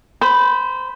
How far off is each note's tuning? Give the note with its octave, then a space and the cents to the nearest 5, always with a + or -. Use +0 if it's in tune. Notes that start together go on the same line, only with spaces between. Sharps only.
C5 -20 B5 +0